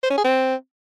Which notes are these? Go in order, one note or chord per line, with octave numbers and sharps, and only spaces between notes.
C5
C#4
G#4
C4